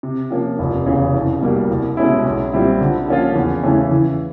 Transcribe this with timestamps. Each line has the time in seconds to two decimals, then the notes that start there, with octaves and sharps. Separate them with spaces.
0.03 C3
0.31 F3 A#3 C#4
0.59 F1
0.86 E2 C#3
1.14 C2
1.41 B2 G3 A#3
1.69 C2
1.97 B2 G#3 C#4 E4
2.24 B1
2.53 A#2 G3 C4 E4
2.81 D3
3.08 F3 A#3 C#4 F4
3.35 E2
3.63 C#3 E3 A3 C#4
3.91 E3